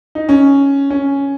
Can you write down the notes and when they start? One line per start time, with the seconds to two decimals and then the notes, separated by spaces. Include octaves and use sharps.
0.15 D#4
0.29 C#4
0.90 C#4